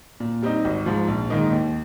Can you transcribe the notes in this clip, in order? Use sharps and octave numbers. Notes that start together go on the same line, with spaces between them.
A#2
G3 C4 D#4
G#1
G#2 F3
A#1
G#2 D#3 A#3 D#4
D#2